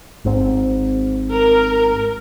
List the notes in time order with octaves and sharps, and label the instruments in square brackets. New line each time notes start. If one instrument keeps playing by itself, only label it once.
[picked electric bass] G#1 G#2 C4
[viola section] A#4